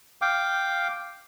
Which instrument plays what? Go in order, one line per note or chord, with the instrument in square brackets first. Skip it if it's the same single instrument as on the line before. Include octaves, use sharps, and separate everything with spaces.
[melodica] F5 G5 D6